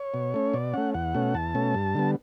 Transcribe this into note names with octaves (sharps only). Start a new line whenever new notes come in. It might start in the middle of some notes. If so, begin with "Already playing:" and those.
Already playing: C#5
B2
A3 C#4
B2 D5
A3 C#4 F#5
E2 F#5
B2 A3 C#4
E2 A5
B2 A3 C#4
G2
D3 G3 B3